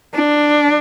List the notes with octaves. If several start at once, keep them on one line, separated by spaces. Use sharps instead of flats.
D4